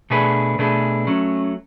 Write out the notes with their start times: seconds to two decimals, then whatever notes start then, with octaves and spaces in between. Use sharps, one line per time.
0.10 B2 A3 D4 G#4 B4
0.59 B2 A3 D4 G#4 B4
1.07 F#3 A3 C#4